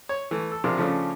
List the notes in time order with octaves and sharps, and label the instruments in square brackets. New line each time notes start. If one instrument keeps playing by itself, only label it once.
[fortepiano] C#5
E3 A3
A4
C3 F3 D4 G#4 A#4
C#3 F3 A3 C#4 D4